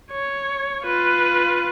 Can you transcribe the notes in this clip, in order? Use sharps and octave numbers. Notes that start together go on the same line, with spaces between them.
C#5
F4 B4